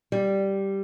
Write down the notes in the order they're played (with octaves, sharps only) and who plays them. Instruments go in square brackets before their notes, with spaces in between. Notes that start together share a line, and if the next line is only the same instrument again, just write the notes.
[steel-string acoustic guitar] G3